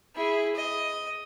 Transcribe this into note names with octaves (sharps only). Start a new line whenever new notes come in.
E4 G#4
D#5